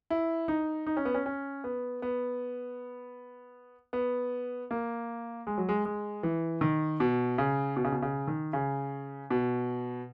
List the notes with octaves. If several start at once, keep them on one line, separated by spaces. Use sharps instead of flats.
E4
D#4
D#4
C#4
B3
C#4
C#4
B3
B3
B3
A#3
G#3
F#3
G#3
G#3
E3
D#3
B2
C#3
B2
C#3
B2
C#3
D#3
C#3
B2